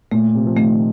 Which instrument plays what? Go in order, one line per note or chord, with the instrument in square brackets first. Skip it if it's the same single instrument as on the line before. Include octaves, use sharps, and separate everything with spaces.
[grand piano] A#2 [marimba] A3
[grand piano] C3
F3
[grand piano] D#3 [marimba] A3